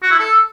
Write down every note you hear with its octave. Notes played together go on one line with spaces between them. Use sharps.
F#4
E4
A4